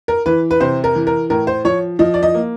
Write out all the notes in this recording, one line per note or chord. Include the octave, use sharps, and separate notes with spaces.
A#4
E3 B4
B4
C3 C5
A#4
E3
A#4
A2 A#4
C5
F3 C#5
F3 D#5
D5
D#5
A#3